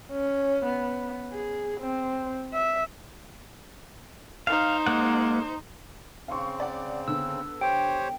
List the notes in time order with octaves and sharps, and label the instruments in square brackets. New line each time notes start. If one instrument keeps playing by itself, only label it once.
[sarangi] C#4
B3
G#4
C4
E5
[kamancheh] D#4 C5 [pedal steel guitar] F5
[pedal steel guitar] G#3 A#3 F#5
[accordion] C#3 C4 [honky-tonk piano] F5 C6 C#6
[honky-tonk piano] D5 F#5
[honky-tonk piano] D3 B3 [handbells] E6
[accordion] G4 C5 C#5 [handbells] G5